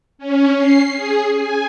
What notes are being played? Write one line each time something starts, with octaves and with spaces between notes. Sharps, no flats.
C#4
C7
G#4
G#5